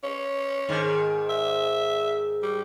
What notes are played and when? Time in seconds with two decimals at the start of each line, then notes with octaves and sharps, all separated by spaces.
0.03 C#4
0.69 G#2 D#3
1.29 E5
2.42 G3